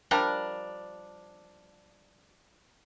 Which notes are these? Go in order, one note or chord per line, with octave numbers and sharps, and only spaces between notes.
F3 G3 D4 A#4